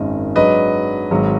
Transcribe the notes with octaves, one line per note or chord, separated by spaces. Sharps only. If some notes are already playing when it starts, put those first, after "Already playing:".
Already playing: G#1 F#2 D#3 G#3 D#5
G#2 F#3 D4 B4 D#5
G#1 G#2 F#3